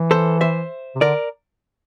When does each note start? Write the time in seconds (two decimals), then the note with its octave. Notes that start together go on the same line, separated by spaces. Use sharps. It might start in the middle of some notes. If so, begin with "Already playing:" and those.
Already playing: E3
0.11 A4 C5
0.41 C5 E5
0.95 C3
1.01 D3 A#4 D5